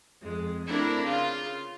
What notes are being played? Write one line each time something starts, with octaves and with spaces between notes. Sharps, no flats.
F2 G#3
A3 C4 D4 E4 A#4
C#3 F4